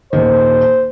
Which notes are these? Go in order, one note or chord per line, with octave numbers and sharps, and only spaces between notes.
D#1 D#3 C5